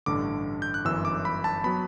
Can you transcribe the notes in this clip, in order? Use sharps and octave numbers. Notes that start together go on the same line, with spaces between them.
A1 G2 D3 D6
G6
F#6
G1 F#2 E3 E6
D6
B5
A5
F#3 B3 B5